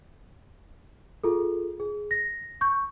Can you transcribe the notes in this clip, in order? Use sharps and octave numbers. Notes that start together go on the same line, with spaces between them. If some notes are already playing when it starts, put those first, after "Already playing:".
F4 G#4 A4
G#4
A#6
C#6 G6